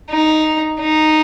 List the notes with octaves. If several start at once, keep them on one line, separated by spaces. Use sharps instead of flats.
D#4
D#4